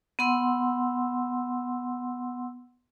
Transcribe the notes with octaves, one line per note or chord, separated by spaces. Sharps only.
B3 F#5 C6 E6